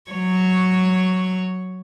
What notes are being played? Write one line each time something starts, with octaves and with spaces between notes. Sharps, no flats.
F#3 C#5